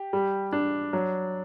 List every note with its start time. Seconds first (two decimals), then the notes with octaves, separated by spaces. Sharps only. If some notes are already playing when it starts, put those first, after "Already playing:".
Already playing: G4
0.13 G3
0.53 D4
0.93 F#3